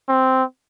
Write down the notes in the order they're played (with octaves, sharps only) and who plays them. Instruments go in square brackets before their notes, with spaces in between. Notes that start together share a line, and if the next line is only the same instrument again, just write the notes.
[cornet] C4